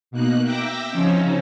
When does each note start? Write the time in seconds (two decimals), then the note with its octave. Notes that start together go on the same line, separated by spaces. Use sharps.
0.11 B2 A#3 D#4 F#6
0.43 E5 G5 D6 E6 A#6
0.89 C#3 F3 C4 C#4 D#4